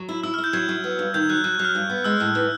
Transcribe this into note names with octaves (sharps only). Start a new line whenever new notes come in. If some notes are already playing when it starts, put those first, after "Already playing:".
Already playing: F#3
E4
E4 E6
F6
E4
G6
F#3 G#6
F#3
B3
G2
D#3 G6
F#3 F#6
F#3 F#6
F#6
F#3
F6
G2
B3
G#3 E6
A2
E3